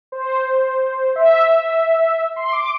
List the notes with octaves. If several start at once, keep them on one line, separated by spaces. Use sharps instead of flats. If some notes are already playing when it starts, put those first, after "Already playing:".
C5
E5
C6
D6